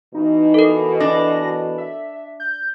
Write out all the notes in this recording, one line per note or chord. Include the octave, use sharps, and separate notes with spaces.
B2 E3 D#4
A4 A#4
D4 A#6
E5
G6